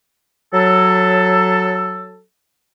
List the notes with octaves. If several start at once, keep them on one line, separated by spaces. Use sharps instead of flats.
F#3 A4